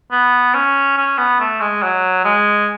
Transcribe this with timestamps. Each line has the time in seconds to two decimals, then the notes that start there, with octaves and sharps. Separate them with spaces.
0.12 B3
0.54 C#4
0.97 C#4
1.18 B3
1.40 A3
1.61 G#3
1.82 F#3
2.25 G#3